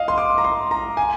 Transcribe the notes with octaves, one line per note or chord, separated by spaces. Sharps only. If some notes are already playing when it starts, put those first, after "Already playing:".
Already playing: D#5 F5
C6
D6
A#5
C6
A#5
G#5